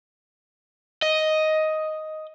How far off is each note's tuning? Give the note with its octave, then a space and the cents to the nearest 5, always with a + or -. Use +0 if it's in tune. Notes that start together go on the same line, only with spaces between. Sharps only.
D#5 +5